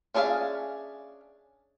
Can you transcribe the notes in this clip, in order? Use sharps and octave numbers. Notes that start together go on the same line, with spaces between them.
C#4 D4 G#4 E5 F5